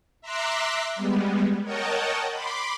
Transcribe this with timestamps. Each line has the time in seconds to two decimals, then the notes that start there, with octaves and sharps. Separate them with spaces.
0.21 E5 A#5 C6 D6 E6 F#6
0.95 G3 G#3 B3
1.63 A#4 C#5 D#5 F#5 G5 A5
2.31 B5 C6 D6